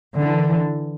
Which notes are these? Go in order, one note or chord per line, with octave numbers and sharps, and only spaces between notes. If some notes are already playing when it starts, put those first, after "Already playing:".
D3 E3